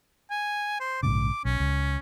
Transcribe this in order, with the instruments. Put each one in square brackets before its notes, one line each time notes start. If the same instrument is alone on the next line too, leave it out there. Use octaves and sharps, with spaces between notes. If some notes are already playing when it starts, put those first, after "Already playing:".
[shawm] G#5
C5
[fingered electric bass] A#1 G#2 C#3 [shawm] D6
[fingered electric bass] B1 [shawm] C#4
[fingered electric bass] C#2